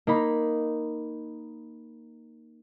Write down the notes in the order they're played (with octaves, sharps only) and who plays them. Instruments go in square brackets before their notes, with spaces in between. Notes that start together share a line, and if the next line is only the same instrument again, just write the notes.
[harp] A#3 D#4 B5